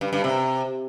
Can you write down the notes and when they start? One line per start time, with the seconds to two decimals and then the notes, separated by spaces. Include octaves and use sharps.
0.01 G2
0.13 G2
0.24 C3